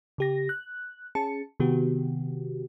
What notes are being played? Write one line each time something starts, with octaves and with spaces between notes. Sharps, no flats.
C#3 G4 A#6
F#6
C#4 G#4 A5 C#7
C3 D#3 B3 F#4 G4